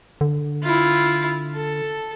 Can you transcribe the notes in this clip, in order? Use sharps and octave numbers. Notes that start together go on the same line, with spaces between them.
D3
E4 F4
A4